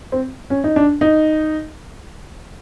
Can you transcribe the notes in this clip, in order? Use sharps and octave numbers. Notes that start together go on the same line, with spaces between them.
C4
C#4
D#4
D4
D#4